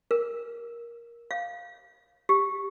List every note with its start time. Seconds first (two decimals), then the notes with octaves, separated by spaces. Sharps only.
0.11 A#4
1.31 F5
2.29 G4